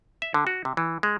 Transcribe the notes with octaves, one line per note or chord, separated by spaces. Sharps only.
E5
D3
F#4
C3
E3
G#3